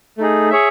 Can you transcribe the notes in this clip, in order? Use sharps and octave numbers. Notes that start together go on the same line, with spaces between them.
A3 D#4 G#4
G#4 C#5 E5